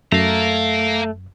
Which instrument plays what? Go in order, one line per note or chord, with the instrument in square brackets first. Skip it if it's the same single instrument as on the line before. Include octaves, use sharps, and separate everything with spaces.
[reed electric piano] F#2 [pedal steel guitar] A3 [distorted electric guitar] F5 A#5